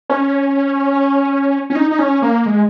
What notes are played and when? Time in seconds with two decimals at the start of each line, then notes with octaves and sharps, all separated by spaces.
0.10 C#4
1.70 C#4
1.75 D#4
1.91 D#4
1.99 C#4
2.22 A#3
2.46 G#3